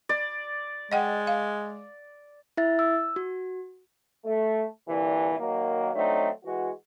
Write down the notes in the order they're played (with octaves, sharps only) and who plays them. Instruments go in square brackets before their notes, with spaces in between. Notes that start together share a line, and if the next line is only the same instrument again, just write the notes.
[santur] D5
[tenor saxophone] G#3 [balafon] D#5 F#5 G5
[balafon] F5
[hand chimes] E4 E5 A6
E6
F#4
[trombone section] A3
C2 A#2 D3 E3
D#3 F#3 A#3
F#3 A3 C4 D4 D#4
E3 G#3 F#4